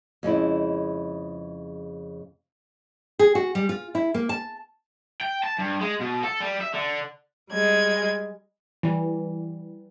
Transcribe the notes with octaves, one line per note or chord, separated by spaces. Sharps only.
F2 C#3 G#3 E4
G#4
F#4
G3
F4
E4
A#3
A5
G5
A5
G2
G#3
B2
A4
G3
E5
D3
G3 G#3 G#6
E3 G3